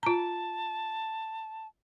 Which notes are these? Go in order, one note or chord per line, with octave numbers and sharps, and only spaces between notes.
F4 A5 A#5